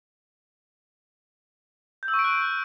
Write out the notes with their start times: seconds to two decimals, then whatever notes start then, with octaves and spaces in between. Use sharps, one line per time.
2.03 G6
2.08 E6
2.14 C#6
2.19 D7
2.24 F#6